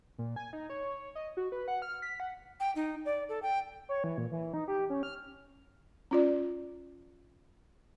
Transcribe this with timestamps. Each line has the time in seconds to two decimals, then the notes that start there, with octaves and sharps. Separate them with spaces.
0.18 A#2
0.36 G#5
0.53 D#4
0.70 C#5
1.15 D#5
1.37 F#4
1.52 B4
1.68 F#5
1.82 F6
2.02 B6
2.20 F#5
2.60 G5
2.76 D#4
3.05 D5
3.29 A4
3.43 G5
3.89 C#5
4.04 E3
4.18 A#2
4.31 E3
4.54 D#4
4.68 G4
4.90 C#4
5.03 F6
6.11 C#4 F4 D5